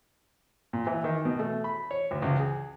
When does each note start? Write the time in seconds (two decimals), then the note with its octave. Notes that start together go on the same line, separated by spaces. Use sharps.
0.73 A#2
0.87 E3
1.04 D#3
1.25 B2
1.39 A3
1.64 B5
1.91 C#5
2.11 D2
2.22 C#2
2.40 G#4